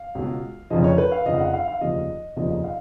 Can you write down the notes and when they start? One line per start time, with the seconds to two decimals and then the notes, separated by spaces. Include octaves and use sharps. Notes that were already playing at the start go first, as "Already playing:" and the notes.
Already playing: F5
0.15 C#2 B2
0.70 F1 F2 C#3 F3 D#5
0.84 C#5
0.98 B4
1.12 F5
1.26 F1 F2 C#3 F3 D#5
1.34 F5
1.40 F#5
1.54 F5
1.68 F5
1.81 F1 D#2 C#3 F3 D#5
2.36 F1 D#2 C#3 F3 D#5
2.64 F5